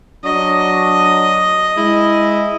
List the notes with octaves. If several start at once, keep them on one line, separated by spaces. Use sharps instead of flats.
F#3 D4 D#5
G#3 E4